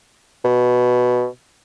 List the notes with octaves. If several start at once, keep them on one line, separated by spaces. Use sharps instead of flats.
B2